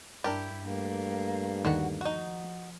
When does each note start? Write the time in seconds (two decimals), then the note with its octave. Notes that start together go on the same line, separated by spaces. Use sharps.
0.24 G2 D4 E4 G4 A#4 A5
0.65 G2 A3 A#3
1.65 D#2 D3 D#3 F#4 F#5
2.01 F3 D#4 F#4